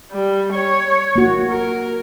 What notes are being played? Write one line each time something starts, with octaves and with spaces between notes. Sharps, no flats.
G3
C#5
A#3 F#4
A#4